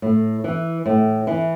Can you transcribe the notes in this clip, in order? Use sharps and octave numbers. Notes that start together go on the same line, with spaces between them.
A2
E3
A2
E3